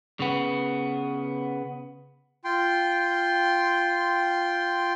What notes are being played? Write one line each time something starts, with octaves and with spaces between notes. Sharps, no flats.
C#3 B3
F4 G5 C6